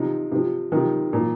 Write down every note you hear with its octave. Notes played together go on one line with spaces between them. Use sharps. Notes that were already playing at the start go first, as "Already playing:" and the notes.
Already playing: C3 F3 D#4
C3 F3
C3 D#3 F3
A#2 F3